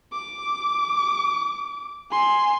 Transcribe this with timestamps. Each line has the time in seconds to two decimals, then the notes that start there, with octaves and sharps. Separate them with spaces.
0.12 D6
2.11 G#5 C6